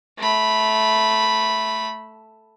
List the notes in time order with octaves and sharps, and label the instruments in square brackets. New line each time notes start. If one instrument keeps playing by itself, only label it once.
[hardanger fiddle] A3 B5